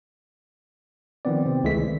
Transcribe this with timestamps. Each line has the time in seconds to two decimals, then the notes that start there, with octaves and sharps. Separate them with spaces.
1.25 D#3 F3 B3 C4 D5
1.46 C3 C4
1.64 C#2 E3 G#3 A3 B6
1.76 D#3